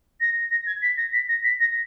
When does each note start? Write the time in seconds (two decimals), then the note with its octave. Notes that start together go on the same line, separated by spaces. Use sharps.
0.20 A#6
0.50 A#6
0.66 G#6
0.82 B6
0.97 A#6
1.12 B6
1.28 A#6
1.44 B6
1.60 A#6